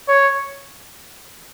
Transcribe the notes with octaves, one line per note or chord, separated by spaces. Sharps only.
C#5